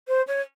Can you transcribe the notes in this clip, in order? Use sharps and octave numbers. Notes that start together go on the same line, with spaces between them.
C5
C#5